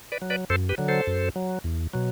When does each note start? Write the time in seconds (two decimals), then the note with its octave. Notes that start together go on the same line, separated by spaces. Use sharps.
0.12 B4 D5
0.22 F#3
0.30 B4 D5
0.50 F#2 A4 C5
0.69 G4 B4
0.78 D3 F#3
0.88 A4 C5
1.07 F#2
1.36 F#3
1.64 E2
1.93 B2 F#3